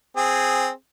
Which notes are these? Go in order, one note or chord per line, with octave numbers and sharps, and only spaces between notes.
C4 G#4